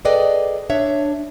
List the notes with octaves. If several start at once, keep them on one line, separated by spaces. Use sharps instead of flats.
G#4 A4 B4 D5 D#5 G5
D4 C#5 E5